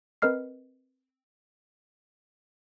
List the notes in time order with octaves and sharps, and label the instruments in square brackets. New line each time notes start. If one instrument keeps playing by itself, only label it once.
[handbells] C4 A#4 B4 D#5 F6 C7